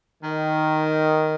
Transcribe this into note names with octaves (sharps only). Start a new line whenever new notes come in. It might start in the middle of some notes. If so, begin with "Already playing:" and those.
D#3